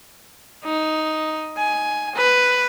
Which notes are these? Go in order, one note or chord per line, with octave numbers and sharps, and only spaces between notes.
D#4
G#5
B4